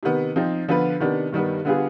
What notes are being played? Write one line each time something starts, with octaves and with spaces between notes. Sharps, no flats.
C3 D#3 B3
F3 C4 D#4
D3 F3 B3 F4 B4
C3 D#3 B3 D4
G2 D#3 G3 B3
D3 G3 B3 F4 G#4